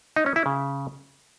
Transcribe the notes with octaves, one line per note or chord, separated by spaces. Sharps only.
D#4
C#4
E4
C#3